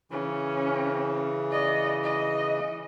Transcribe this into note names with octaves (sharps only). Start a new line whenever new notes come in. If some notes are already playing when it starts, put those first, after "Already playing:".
C#3 E3 C#4
D5 D#5
D#5